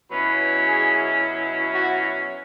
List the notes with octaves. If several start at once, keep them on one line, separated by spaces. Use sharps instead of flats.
B2 F#3 C#4 E4 B4
G#4
F#4